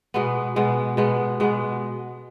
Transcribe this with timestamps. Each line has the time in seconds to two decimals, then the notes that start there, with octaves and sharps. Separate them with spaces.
0.14 B2 G#3 B3
0.56 B2 G#3 B3
0.97 B2 G#3 B3
1.40 B2 G#3 B3